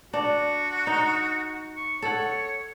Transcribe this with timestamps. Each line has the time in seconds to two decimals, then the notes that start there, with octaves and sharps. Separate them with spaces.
0.13 D4 F#4
0.87 D#4
1.77 C#6
2.02 A4 C#5 F#5